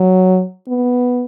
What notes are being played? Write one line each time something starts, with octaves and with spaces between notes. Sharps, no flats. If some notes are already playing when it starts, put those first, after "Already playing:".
Already playing: F#3
B3